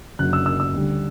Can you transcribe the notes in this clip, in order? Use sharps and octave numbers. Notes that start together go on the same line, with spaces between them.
F#1 F#2 D3 F#3 A#3 F#6
E6
E6
E6
D2 D3 G3